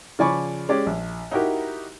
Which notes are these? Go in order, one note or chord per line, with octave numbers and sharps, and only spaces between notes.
C#3 F3 D5 G#5 B5 C#6
G#3 C#4 G4 D5
A#1
D#4 E4 F#4 G4 A#4